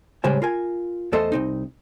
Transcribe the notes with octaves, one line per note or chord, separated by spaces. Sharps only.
A2 C#3 G3 G#3 C5 G#5
F4 A#4 G#5
E2 A3 A4 C5 D#5 C6
C2 C4 D#4